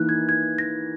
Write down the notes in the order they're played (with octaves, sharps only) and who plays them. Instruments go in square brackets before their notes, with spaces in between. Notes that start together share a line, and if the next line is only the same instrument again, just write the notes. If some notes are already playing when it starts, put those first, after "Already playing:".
Already playing: [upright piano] E3 A#3 D#4 A#4 [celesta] F#6
[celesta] G#6
G#6
A#6